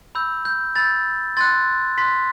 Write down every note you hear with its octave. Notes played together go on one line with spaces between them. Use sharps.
B5 E6 G6
G6
B5 E6 G6 A6
C6 F#6 A6
C6 F#6 B6